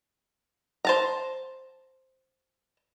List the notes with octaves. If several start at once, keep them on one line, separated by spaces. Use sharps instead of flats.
C5 A5 A#5